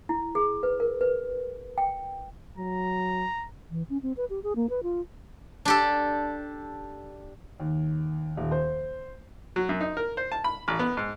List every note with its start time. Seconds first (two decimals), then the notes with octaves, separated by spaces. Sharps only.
0.09 E4
0.35 G#4
0.63 B4
0.80 A#4
1.01 B4
1.78 G5
2.57 F#3 A#5
3.71 E3
3.90 C#4
4.03 C4
4.17 B4
4.30 G4
4.43 G#4
4.56 A#3
4.70 B4
4.83 F4
5.65 D4 G4 A4
7.60 D#2
8.37 D#1
8.51 C5
9.56 F#3
9.69 F#2
9.81 D#4
9.97 A#4
10.17 C5
10.32 A5
10.44 B5
10.68 A1
10.79 B3
10.97 G#2